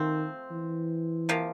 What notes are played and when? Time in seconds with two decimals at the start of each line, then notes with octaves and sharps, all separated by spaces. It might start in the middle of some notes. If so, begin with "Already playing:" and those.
Already playing: D#3 F3 A3 C4
0.51 E3
1.29 C3 F3 A#3